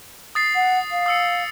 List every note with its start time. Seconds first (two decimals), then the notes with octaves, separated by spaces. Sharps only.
0.35 D#6 A6 C7
0.55 F#5
0.91 F5
1.06 D#6 E6 C#7